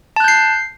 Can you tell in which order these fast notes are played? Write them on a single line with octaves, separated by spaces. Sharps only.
A5 F#6 G6 C7